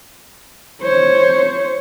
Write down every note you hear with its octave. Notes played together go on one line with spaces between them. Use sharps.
C5 C#5